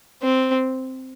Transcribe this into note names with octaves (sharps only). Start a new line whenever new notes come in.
C4